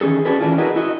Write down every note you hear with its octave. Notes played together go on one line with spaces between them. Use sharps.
D#3 E3 C#4 G#4 A4
C#4 D4 F#4 G#4 A4 B4
E3 C#4 D4 E4 F4
E4 F#4 G#4 A#4 B4 D#5
E4 F#4 D#5